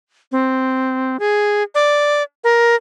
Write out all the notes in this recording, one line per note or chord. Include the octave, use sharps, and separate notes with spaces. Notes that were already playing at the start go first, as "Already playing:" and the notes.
C4
G#4
D5
A#4